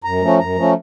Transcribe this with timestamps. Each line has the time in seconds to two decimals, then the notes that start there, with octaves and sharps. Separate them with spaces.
0.04 F#2 A#5
0.22 F3 A3 C#4
0.39 F#2 A#5
0.56 F3 A3 C#4